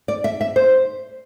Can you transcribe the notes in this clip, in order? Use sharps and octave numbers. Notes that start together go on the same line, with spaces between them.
D5
E5
E5
C5